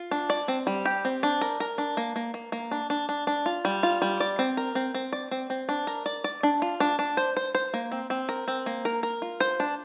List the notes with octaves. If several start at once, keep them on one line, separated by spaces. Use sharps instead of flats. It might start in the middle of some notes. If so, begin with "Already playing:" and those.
Already playing: F4
D4
D5
C4
G3
G4
C4
D4
A#4
A#4
D4
A#3
A#3
A#3
A#3
D4
D4
D4
D4
F4
G3
F4
G3
D5
C4
A#4
C4
C4
D5
C4
C4
D4
A#4
D5
D5
D4
F4
D4
D4
C5
C5
C5
A#3
C4
C4
A#4
C4
A#3
A#4
A#4
F4
C5
D4